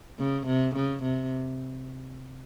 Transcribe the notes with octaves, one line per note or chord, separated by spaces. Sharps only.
C#3
C3
C#3
C3